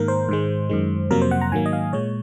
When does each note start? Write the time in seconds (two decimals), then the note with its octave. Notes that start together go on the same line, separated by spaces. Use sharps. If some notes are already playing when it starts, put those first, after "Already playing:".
Already playing: G#2 D#3 A#3 A#4
0.08 C5
0.29 G#2 D#3 G#3
0.69 F#2 D#3 G#3
1.10 F2 C3 F#3 A#3 A#4
1.22 C5
1.31 F#5
1.41 A#5
1.52 G#2 D#3 F#3 A#3 G#5
1.66 D#5
1.73 F5
1.93 A#2 G#3 C#5